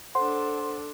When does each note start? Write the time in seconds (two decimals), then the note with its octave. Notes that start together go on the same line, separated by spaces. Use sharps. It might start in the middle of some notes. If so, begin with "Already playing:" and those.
0.15 D4 A4 C5 F#5 C6